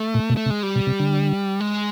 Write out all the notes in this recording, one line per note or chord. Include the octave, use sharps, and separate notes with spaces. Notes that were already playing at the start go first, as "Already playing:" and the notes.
Already playing: A3
A#2
B2
A3
C3
G#3
G3
B2
C3
D3
G#3